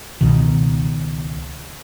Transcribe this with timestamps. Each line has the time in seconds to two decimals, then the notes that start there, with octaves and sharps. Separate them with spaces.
0.21 C#2 B2 D#3